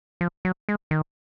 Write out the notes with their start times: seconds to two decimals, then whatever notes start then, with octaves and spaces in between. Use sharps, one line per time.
0.21 F3
0.45 F#3
0.69 G#3
0.91 D#3